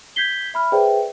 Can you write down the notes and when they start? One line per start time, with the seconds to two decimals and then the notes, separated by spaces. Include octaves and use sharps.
0.16 G6 G#6 B6 C7 G7
0.54 E5 B5 F6
0.72 G#4 B4 C5 D5 E5 G5